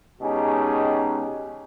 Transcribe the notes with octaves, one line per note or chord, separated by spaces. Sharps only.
B2 G#3 C#4 D#4 G4 G#4